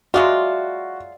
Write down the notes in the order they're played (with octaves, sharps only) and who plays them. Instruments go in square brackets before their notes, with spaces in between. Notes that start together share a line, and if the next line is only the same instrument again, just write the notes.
[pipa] F#3 G#3 F4 [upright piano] F#4 [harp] D5 E5 F#5